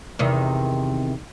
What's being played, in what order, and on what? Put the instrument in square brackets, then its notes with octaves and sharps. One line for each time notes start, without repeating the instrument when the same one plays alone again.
[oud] E2 C3 D#3